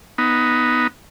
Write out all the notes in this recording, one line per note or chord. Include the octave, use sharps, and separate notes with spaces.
B3 D#4